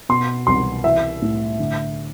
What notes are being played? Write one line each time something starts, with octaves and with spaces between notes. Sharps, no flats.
B2 C6
C2 C6
E3 E5
A2
D3